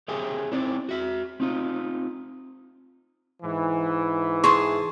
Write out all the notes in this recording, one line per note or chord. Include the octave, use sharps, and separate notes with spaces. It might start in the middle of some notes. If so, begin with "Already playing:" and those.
G4 G#4 C#5 E5 G5 G#5
C4 D#4 E4 D5
F#4 E5
C4 D#4 F4
G#2 E3
G#4 A5 C6 C#6